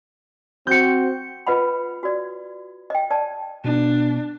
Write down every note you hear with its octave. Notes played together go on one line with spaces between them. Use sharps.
C4 F#4 G6 C#7
F4 B4 D#5 F#5 B5
F#4 D5
D#5 G5
D5 A5
B2 B3 D4